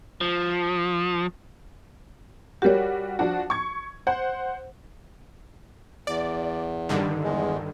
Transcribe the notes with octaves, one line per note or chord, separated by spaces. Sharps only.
F3
G3 F#4 G4 A#4 C#5
F3 D4 F#4
C#6 G#6
C5 F#5
E2 D5
G2 D3 D#3
E2 G#3